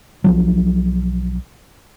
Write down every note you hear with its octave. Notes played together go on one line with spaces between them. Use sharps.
B1 F3 F#3